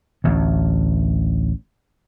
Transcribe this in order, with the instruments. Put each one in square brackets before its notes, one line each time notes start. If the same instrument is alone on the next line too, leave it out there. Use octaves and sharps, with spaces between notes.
[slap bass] A1 D2